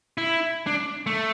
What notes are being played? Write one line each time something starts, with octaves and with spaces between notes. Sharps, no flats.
E4
D4
A3